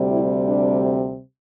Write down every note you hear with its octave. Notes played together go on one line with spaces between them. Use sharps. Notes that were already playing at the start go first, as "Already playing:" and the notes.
Already playing: D2 C3 G3
E4
D4